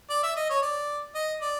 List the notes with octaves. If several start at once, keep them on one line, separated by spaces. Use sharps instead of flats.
D5
E5
D#5
C#5
D5
D#5
D5